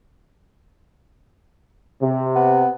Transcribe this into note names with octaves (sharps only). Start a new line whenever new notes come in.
C3
B3